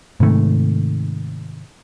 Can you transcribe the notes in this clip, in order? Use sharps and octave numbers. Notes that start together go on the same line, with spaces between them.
G#2 C3 D#3 A3